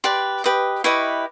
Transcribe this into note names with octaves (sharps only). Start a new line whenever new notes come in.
G4 B4 D5 C6
G4 B4 D#5
E4 G4 B4 D#5 C#6